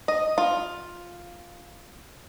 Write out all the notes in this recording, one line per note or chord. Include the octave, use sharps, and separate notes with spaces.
D#5
F4